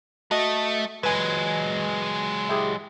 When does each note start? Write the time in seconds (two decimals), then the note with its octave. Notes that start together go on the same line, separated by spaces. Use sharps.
0.31 A3 F#4 D#5
1.03 F#3 G#3 B4 G#5
2.49 E4 G4 G#4